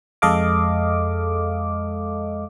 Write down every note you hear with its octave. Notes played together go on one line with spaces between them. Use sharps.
F2 G#3 A4 D#5 F5 D6